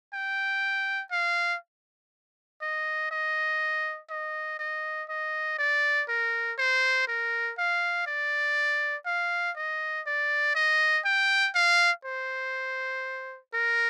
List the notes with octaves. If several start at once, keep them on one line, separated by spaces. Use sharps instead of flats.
G5
F5
D#5
D#5
D#5
D#5
D#5
D5
A#4
C5
A#4
F5
D5
F5
D#5
D5
D#5
G5
F5
C5
A#4